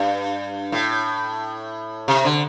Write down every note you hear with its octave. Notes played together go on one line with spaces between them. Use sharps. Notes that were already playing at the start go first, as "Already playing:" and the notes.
Already playing: G2
A2
C3
D3